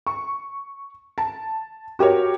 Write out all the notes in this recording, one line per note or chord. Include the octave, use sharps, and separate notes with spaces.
C#6
A5
F#4 G4 A#4 C#5